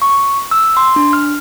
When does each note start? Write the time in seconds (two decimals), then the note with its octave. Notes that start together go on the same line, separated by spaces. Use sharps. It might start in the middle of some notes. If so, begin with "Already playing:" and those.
0.02 C#6
0.51 E6
0.77 C6
0.96 D4
1.13 F6